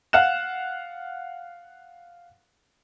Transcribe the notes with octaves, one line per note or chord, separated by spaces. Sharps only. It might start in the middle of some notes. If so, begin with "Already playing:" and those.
F5 F#5 F#6 E7